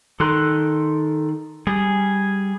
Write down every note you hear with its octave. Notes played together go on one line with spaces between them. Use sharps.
D#3 A4 C6 F#6
G3 G#4